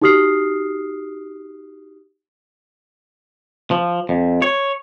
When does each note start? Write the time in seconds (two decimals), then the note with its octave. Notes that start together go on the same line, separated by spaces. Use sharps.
0.02 D#4 F#4 G4 D#6 F6 C7
3.71 F3
4.09 F2
4.42 C#5